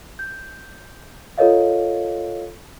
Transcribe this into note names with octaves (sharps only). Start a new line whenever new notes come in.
G6
F4 A4 A#4 C#5 D#5 F5